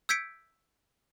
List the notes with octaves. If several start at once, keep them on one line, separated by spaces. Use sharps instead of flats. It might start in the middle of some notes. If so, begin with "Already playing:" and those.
E6 G6 G#6 B6 C#7 D7